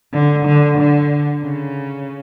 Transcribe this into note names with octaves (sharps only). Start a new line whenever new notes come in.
D3
D3
D3
C#3